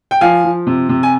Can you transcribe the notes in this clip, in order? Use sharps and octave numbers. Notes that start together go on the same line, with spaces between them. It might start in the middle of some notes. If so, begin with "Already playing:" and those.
G5
F3 F5 G#5
F3
C3
C3
G#5